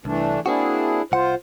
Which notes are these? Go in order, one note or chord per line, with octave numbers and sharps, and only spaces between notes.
C2 E3 A3 D4
A#3 C4 D4 E4 F#4 G#4
C2 F4 C5 F#5